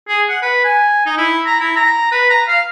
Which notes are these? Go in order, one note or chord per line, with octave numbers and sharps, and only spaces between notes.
G#4
F#5
B4
G#5
D#4
E4
A#5
E4
A#5
B4
A#5
F5